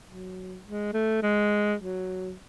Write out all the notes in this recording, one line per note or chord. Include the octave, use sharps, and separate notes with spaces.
F#3
G#3
A3
G#3
F#3